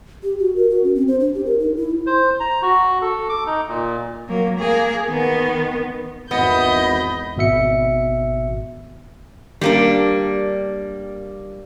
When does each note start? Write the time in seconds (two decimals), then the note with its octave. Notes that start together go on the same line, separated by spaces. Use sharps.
0.23 G4
0.39 F#4
0.56 A#4
0.70 F#4
0.83 C#4
0.95 C4
1.08 C5
1.20 D4
1.34 G4
1.45 A#4
1.59 D#4
1.76 E4
2.07 C5
2.40 A#5
2.62 F#4
3.02 A4
3.29 D6
3.47 D#4
3.68 A#2
4.28 F#3 A#3
4.59 A#3 G#4
5.09 D#3 B3
6.31 G#1 E2 B3 D#5 B5 G6
7.37 G#1 B2 E5 C#7
9.61 G3 A#3 D4